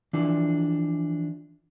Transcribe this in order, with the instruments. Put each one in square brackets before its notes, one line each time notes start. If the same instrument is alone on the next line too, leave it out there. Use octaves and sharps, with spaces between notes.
[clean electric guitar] E3 F3 D4